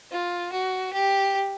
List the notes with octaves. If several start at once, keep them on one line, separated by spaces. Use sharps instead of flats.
F4
F#4
G4